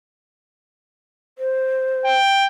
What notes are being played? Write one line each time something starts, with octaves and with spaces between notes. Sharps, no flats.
C5
G5